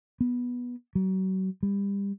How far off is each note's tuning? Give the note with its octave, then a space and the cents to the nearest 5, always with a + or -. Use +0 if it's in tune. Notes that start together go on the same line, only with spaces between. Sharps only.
B3 -10
F#3 +35
G3 +30